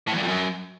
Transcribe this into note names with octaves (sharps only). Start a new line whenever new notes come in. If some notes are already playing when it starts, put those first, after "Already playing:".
A2
E2
G2
F2
F#2